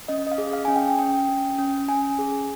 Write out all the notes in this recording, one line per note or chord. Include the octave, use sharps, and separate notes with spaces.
C#4 D#5
D#5
F5
G#4
F5
C#4 G#5
G5
C#4 G5
C#4
C#4
C#4 G#5
G#4